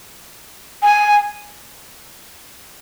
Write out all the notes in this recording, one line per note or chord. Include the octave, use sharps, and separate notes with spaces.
G#5